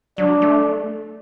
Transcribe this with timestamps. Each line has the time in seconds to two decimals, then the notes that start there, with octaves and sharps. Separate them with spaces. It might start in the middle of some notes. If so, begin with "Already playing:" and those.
0.18 F#3 D4
0.42 A3